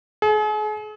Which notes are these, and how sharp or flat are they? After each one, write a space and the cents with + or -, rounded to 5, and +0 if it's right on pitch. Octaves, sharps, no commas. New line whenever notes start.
G#4 +40